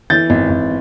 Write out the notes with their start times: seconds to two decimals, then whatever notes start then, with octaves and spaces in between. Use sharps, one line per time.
0.10 E3 G6 A6
0.30 G#1
0.50 G#1